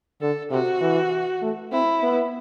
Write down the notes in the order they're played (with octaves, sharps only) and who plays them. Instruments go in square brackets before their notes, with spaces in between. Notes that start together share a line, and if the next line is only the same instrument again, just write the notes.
[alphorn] D3 [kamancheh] A4
[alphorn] C3 [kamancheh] F#4
[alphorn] E3
A3
[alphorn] C4 [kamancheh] E4
[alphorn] B3